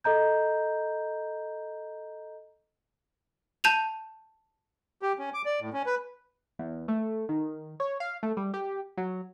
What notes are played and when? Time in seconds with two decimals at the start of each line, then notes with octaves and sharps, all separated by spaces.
0.04 A4 D#5 A#5 G6
3.64 A5 G6 D#7 F7
5.02 G4
5.19 C#4
5.34 D6
5.46 D5
5.60 A2
5.73 C#4
5.86 B4
6.59 E2
6.88 A3
7.29 D#3
7.80 C#5
8.00 F5
8.23 A3
8.37 G3
8.54 G4
8.97 F#3